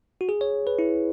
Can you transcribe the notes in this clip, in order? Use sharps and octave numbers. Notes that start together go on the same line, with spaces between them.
F#4
G#4
C#5
B4
E4